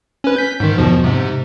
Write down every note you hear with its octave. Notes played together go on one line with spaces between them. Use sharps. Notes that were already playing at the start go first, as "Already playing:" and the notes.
C#4 B4
G6 B6
G#2 D#3
E2 B2 F3
G#2 C3